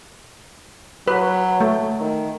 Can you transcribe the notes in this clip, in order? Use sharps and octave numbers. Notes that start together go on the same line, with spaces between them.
F#3 B4
A3
D#3